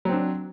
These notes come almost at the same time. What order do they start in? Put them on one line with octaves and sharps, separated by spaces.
F#3 C4 D4